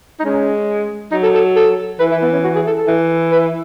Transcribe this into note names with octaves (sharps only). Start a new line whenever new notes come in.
D#4
G#3 C#4
F#3 D#4
A4
A4
A4
E3 B4
E4
B3
C#4
F#4
G#4
A4
A4
E3
B4